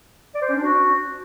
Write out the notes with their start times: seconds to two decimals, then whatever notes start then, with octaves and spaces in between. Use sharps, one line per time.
0.34 D5
0.42 C5
0.49 C#4
0.56 D4
0.63 F#4